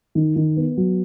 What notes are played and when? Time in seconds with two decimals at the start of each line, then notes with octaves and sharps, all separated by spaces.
0.15 D#3
0.36 D#3
0.57 B3
0.77 F#3